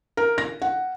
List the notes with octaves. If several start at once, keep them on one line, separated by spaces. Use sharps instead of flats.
A#4
A#6
F#5